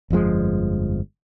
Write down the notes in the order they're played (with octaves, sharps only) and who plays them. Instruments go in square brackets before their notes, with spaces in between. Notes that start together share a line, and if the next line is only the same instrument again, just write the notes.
[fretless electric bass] G1 F2 F3 G#3